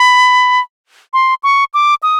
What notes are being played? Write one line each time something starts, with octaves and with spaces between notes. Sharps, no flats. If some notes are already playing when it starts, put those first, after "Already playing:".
Already playing: B5
C6
C#6
D6
D#6